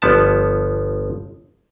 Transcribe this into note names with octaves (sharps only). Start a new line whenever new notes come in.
G1 F3 B3 A5